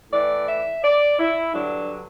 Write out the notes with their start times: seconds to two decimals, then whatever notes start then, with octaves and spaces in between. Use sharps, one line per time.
0.12 A2 E3 D5
0.47 E5
0.83 D5
1.19 E4
1.53 G2 D3 F#3 D4